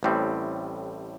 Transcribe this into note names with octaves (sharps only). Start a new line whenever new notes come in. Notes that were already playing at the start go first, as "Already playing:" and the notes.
A1 A2 G3 C4